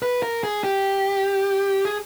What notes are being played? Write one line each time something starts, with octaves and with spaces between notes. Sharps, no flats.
B4
A#4
G#4
G4
G#4